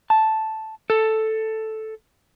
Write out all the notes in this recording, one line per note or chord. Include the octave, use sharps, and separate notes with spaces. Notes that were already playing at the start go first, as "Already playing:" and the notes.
A5
A4